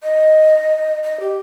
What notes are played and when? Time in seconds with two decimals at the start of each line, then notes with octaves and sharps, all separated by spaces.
0.03 D#5
1.03 D#5
1.20 G4